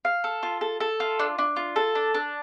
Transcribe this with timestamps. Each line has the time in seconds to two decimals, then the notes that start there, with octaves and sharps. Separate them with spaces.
0.05 F5
0.24 A4
0.43 F4
0.61 A4
0.80 A4
1.00 F4
1.19 D4
1.38 D4
1.56 F4
1.76 A4
1.95 D4
2.14 D4